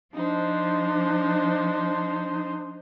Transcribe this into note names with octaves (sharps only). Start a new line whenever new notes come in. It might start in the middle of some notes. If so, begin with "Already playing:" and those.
F3 D4 D#4 C5